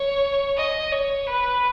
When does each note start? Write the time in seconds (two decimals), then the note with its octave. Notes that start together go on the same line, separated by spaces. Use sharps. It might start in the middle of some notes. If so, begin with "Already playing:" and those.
Already playing: C#5
0.57 D#5
0.91 C#5
1.27 B4